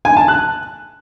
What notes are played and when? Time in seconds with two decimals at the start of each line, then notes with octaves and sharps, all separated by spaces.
0.05 G#5
0.17 A5
0.28 F#6